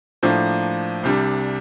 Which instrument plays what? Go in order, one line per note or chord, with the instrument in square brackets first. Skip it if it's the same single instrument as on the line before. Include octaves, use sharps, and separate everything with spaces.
[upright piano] A2 F3 A#3 D4
C2 C3 G3 D4